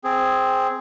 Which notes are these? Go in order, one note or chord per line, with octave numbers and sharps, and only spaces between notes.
C4 G#4